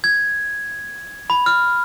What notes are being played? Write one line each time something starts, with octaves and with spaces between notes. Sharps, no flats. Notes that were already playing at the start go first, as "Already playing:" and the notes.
G#6
B5
F6